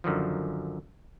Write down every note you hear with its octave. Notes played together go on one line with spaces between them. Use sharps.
F#2 D3 D#3 F3